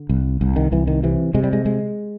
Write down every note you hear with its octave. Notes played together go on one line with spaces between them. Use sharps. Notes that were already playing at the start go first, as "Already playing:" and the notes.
Already playing: D3
C2
C2
D#3
C2 E3
D#3
C3 E3
C3 G#3
G3
G#3
G#3